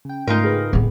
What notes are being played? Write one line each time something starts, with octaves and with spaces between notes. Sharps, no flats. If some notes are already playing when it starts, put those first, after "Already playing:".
C#3 G5
G#2 A3 D#4 F4 A#4
G#4 B4
D1 B3